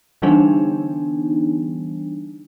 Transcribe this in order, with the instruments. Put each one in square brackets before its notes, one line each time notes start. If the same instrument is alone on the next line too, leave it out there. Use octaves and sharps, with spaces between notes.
[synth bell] D3 E3 G3 B3 D4 D#4